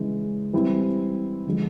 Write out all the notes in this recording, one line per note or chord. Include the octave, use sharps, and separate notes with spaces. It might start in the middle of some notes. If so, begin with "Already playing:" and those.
Already playing: C#3 E3 G#3
E3 G3 C4 E4
D3 F3 G#3